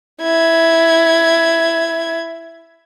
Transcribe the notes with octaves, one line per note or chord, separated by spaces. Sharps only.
E4 G#6